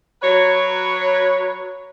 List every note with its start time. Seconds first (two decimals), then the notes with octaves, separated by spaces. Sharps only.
0.22 F#3 B4 C#5